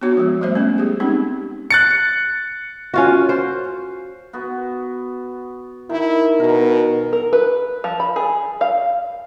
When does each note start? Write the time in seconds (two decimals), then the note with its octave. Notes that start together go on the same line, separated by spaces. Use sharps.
0.01 B3 D4 F#4 C#5
0.17 F3 G#3
0.41 G3 A3 C5 E5
0.55 B3 C#4
0.78 G4 G#4
1.00 G#3 C4 C#4 D#4
1.71 F#6 A6 C#7
2.94 C#4 F4 F#4
3.29 C5
4.33 B3 F#4
5.90 D#3 E4
6.40 B2 A#4
7.13 A#4
7.33 B4
7.84 F3
8.00 B5
8.16 G#4
8.61 F5